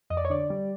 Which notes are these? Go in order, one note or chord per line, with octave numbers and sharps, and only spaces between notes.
F2 D#5
D5
C#5
D3 D5
G3